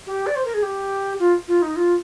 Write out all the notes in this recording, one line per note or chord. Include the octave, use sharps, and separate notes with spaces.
G4
D5
C5
A#4
G#4
G4
F4
F4
D#4
F4